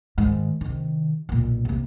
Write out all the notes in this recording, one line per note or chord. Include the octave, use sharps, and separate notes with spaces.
G#2 D#3
C3 D#3
B1 A#2
C3 A#3